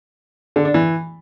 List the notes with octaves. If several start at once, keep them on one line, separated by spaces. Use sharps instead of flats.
D3
D4
E3